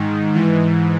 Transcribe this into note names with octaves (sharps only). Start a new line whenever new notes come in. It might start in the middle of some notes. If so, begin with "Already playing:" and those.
Already playing: G#2 D#3
G#2 E3